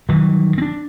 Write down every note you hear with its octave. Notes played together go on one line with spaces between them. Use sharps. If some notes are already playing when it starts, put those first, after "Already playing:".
G2 D#3 E3 F#3
C4 D4